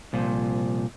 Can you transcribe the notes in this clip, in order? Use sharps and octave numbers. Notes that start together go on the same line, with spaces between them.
C2 A#2 F3